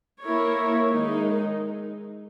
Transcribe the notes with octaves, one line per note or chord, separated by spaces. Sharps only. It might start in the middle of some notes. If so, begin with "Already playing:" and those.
A#3 E4 A#4 C#5
D#3 G#3 D#4